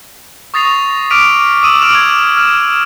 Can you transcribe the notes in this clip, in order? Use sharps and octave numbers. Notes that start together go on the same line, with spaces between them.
C#6 D#6 A6 A#6 C7 F7
D6 F6 B6 D7 D#7 F7
D#6 E6 D#7 E7 F#7
C#6 D6 F6 D7 E7 F7
G#6
F6 E7 F#7